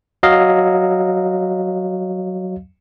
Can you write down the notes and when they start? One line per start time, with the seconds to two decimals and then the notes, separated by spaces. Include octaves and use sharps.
0.23 F#3 D#5 F5